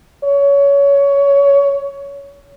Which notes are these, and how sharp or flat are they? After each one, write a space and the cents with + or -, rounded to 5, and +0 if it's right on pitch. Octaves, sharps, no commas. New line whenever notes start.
C#5 +20